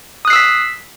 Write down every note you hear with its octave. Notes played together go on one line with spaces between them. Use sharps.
D#6 E6 F#6 B6 C7